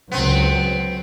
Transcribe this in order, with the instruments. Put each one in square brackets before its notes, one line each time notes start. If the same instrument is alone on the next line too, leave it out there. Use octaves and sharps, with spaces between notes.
[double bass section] C#2 D3 F#3 [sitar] B3 C4